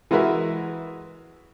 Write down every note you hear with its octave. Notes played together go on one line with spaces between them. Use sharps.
E3 G#3 F#4 A#4 B4 E5